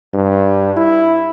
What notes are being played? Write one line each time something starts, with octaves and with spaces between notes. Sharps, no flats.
G2
E4